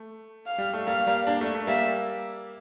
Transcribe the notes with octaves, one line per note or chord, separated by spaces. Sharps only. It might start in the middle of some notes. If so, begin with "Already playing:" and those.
Already playing: A3
F5
G3
A3
G3 A#3 F5
G3 A#3
A#3 D4
A3
A3
G3 A#3 E5